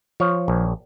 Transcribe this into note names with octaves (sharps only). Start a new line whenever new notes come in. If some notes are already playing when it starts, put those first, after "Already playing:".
F3 C#5
A#1